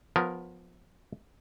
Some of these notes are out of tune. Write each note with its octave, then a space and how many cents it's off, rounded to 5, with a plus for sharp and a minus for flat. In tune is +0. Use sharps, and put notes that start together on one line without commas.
F3 +25 B3 +10 A#4 +0